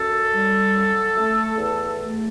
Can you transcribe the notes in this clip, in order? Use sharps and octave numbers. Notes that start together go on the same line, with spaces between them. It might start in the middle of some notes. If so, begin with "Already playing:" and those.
Already playing: F#2 A4
G3
F#2
A3
E2
A3